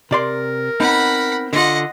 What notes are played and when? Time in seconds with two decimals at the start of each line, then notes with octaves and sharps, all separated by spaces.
0.11 C3 A#4 D5 C6
0.80 B3 C4 D#4 F#5 B5
1.53 D3 F4 D#5 F#5